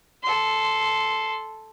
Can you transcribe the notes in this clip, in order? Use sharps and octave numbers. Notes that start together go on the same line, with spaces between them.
A4 C6